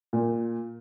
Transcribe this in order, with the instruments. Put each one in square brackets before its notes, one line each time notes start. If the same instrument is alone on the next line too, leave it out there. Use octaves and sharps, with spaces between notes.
[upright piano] A#2